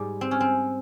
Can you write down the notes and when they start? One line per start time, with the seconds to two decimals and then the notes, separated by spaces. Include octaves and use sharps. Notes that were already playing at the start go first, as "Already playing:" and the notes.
Already playing: G#2 G3
0.21 C4
0.31 C#4
0.40 C4